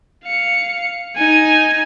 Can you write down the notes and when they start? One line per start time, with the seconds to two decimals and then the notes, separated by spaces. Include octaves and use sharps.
0.25 F5 C#7
1.16 D#4 G#5